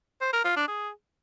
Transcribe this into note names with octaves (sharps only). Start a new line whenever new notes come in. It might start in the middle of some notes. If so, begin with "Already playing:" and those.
C5
A#4
F4
D4
G#4